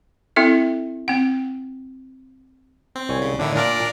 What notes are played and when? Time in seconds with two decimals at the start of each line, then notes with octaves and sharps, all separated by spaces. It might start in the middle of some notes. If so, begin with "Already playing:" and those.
0.36 C4 E4 A4 E5
1.08 C4 F#5
2.95 C4
3.09 C2 C#5 G#5
3.22 C#3
3.39 A2 D3 D#3 D4 E4
3.55 A#2 D4 A#4 D5